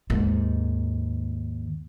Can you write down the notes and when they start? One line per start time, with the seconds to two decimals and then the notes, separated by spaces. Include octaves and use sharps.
0.10 D#2 G#2